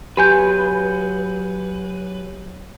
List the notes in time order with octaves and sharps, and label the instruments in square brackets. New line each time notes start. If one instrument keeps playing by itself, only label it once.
[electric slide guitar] F#3 B4 [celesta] G4 G#5 G6